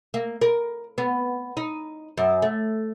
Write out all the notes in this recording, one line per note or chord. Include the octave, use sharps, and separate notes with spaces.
A#3
A#4
B3
D#4
F#2
A3